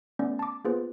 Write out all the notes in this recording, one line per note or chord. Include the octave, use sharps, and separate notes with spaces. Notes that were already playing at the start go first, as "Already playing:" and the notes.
A3 B3 C#4 D5
A5 D6
A#3 B3 F4 G#4 B4 C5